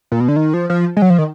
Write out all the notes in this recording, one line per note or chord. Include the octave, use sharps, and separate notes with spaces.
A#2
B2
D3
D#3
F3
F3
G#3
F#3
F3
D#3